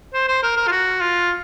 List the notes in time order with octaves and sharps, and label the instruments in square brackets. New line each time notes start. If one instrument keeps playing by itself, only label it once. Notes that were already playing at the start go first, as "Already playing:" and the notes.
[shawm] C5
C5
A#4
A#4
F4
F#4
F4